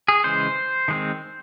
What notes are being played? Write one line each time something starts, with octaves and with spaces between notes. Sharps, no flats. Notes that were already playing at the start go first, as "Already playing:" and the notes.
G#4
C#3 E3 G#3 C5
D#3 G#3 C4